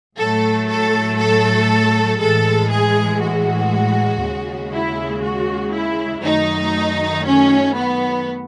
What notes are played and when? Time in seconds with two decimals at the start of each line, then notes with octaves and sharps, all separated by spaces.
0.18 A2 F#3 A3 A4
0.69 A4
1.20 A4
2.20 A2 E3 G#3 A4
2.70 G#4
3.22 F#4
4.22 D#2 C#3 G#3
4.72 E4
5.24 F#4
5.74 E4
6.24 F#2 D#3 F#3 A3 D#4
7.26 C#4
7.76 B3